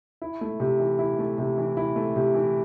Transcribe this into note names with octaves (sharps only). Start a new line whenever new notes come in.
E4
A3
C3
E3
E4
A3
C3
E3
E4
A3
C3
E3